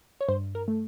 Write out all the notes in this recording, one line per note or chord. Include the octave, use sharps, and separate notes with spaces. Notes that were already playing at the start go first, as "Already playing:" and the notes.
C#5
G2 C5
A#4
A3